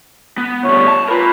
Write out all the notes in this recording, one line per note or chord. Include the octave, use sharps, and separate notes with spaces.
B3
D2 G3 C#5
A5
F4 A#4 B4